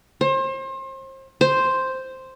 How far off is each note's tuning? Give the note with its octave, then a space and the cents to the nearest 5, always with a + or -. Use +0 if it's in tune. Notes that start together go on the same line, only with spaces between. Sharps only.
C5 +35
C5 +0